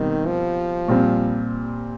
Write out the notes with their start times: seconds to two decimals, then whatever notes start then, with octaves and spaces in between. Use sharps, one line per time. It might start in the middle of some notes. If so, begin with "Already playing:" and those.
Already playing: B2 D#3 G3 C4
0.26 F3
0.88 A#2 G3 C4